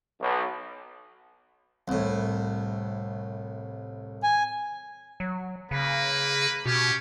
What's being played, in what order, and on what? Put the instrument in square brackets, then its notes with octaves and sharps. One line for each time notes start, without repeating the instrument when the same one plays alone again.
[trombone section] B1
[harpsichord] C2 A2
[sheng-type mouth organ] G#5
[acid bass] F#3
[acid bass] C#3 [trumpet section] A#3 B4
[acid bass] B2 [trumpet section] C#4 G4